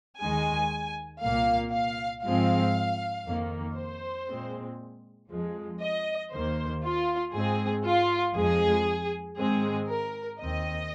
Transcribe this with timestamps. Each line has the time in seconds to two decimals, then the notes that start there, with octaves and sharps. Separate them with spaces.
0.20 D#2 D#3 G#3 G#5
1.22 C2 A#2 A#3 F5
1.73 F5
2.24 G#2 F3 G#3 C4 F5
3.26 F2 D#3 A#3
3.76 C5
4.28 A#2 G#3 C4
5.30 F2 F3 G#3
5.81 D#5
6.32 D#2 D#3 A#3 C5
6.83 F4
7.34 G#2 G#3 C4 G#4
7.85 F4
8.36 F2 F3 G#3 G#4
9.38 G#2 D#3 G#3 C4 G#4
9.88 A#4
10.40 D#2 D#3 C4 D#5